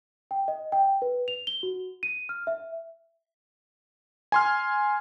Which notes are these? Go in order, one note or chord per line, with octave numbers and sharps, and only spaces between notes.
G5
D#5
G5
B4
F7
G7
F#4
D#7
F6
E5
G#5 C6 F6